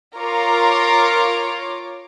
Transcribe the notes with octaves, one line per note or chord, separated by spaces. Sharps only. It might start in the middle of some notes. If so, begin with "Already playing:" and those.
F4 A#4 C#5 D6